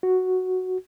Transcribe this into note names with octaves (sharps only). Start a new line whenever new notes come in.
F#4